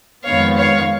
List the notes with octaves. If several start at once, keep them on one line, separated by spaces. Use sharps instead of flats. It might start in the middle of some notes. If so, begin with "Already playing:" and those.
F2 D#3 G#3 B3 C#5 F5
C#5 F5